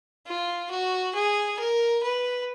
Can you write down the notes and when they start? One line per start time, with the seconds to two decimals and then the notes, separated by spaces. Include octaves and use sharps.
0.27 F4
0.71 F#4
1.15 G#4
1.59 A#4
2.03 B4